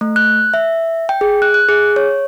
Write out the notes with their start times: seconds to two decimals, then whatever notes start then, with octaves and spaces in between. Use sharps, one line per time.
0.01 A3
0.16 F#6
0.54 E5
1.09 G5
1.21 G#4
1.42 F#6
1.54 F#6
1.69 G#4
1.96 C#5